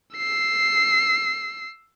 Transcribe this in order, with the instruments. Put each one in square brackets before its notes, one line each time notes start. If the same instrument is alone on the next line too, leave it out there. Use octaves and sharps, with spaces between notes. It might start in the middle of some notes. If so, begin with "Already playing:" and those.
[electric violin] E6 C7